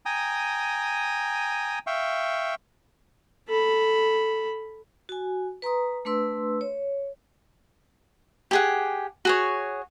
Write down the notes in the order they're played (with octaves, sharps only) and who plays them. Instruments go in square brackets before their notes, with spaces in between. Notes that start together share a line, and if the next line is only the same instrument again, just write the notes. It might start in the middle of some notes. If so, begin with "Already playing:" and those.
[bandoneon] G5 G#5 A#5 D#6
E5 F5 G5 C#6
[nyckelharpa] A4 B5
[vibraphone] F#4 G#5
B4 A#5 C6 D#6
A3 D4 B4 C6 E6
C#5
[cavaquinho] G4 G#4 F#5
F#4 G#4 C#5